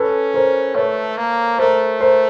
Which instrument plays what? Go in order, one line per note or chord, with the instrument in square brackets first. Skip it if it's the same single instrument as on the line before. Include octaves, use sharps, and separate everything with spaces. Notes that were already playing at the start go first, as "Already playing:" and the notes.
Already playing: [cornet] C#4 [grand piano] A4 B4
[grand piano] A#4 C5
[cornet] A3 [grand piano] B4 C#5
[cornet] A#3
[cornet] A3 [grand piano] A#4 C5
[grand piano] A#4 C5